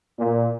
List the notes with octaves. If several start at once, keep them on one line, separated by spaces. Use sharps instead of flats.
A#2